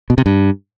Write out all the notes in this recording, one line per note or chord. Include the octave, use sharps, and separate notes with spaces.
B2
C3
G2